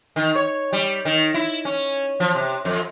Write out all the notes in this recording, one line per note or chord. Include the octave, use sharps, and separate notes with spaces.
D#3
C#5
G3
D#3
E4
C#4
F3
C3
F2